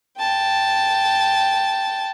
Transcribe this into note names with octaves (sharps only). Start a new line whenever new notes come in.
G5 A5